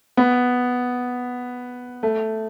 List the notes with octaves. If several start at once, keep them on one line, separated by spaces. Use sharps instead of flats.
B3
A3